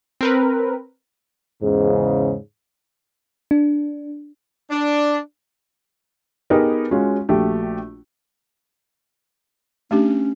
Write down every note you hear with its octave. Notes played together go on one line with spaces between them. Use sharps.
C4 A#4 B4
E2 G#2 C#3
D4
D4
B3 D#4 G4 G#4 A#4 B4
G#3 C#4 F4 F#4
A#1 A3 F#4 G4
A3 C#4 D4 G4